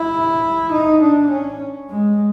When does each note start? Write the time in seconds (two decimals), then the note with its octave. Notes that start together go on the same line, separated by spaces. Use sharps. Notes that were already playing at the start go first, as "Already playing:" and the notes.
Already playing: E4
0.72 D#4
1.01 D4
1.30 C#4
1.90 G#3